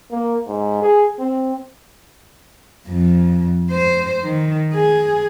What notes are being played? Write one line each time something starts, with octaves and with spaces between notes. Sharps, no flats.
A#3
G#2
G#4
C4
F2
C5
D#3
G#4